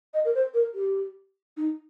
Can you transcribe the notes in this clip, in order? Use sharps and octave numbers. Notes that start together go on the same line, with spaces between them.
D#5
A#4
C5
A#4
G4
D#4